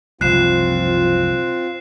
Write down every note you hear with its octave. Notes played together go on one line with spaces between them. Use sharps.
F#1 C2 F3 C4 F4 F#6 C7 E7